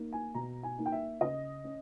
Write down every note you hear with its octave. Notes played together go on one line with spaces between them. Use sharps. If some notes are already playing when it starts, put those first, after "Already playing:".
Already playing: A#3 D#4
G#5
B2 A#5
G#5
A#3 D#4
G5
E5
C#3 D#5
C#4